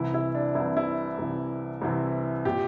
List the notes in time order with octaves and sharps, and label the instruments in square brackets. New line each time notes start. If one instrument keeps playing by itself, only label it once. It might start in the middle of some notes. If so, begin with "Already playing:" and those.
Already playing: [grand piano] C2 C3 E3 E4
E4
D4
C2 C3 E3 E4
E4
C2 C3 E3
C2 C3 E3
A#2 G4